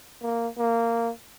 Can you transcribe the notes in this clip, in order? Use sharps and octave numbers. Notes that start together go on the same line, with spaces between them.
A#3
A#3